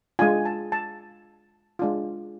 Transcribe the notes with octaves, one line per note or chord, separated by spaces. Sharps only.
G#3 D4 F4 G#5
A5
A5
G#3 D4 F4